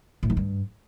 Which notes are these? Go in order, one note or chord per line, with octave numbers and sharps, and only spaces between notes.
A2
E3
G2